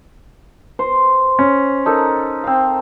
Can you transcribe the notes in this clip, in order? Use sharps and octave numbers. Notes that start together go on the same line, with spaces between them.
C5
C#4
D#4 A4 A#4
C4 F5